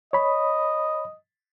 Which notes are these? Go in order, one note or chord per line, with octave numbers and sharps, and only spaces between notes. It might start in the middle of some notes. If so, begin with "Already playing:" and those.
C#5 D#5 B5